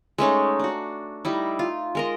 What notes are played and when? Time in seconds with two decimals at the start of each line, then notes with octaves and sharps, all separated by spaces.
0.18 G#3 A3 C#4 D#4
0.59 D4 F#4
1.25 G3 D#4 E4
1.59 F4
1.95 G#3 A#4 D#5